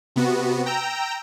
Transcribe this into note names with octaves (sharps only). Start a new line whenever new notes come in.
C3 B3 F#4
G5 A#5 E6